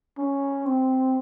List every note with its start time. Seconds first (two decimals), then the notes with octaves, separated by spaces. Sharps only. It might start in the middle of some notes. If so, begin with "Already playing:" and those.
0.18 C#4
0.66 C4